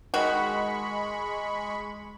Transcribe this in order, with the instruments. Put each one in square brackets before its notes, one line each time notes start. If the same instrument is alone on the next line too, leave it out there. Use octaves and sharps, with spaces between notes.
[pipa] D#3 F#4 [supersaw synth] G#3 B5 C#6